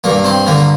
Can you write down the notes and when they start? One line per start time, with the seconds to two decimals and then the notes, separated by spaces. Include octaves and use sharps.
0.04 G2 A#3
0.25 C4
0.46 D3 A#3